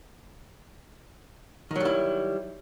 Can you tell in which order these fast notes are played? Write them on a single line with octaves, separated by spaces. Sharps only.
D#3 F#3 G3 E4